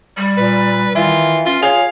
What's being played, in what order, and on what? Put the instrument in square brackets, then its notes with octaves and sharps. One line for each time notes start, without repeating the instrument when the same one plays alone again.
[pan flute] G3
[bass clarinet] A#2 [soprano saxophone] B4
[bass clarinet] D#3 [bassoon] E3 [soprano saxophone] F4
[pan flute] C#4 [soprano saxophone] F4
[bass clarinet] F4 [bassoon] G#4 [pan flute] C#5 [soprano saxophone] F5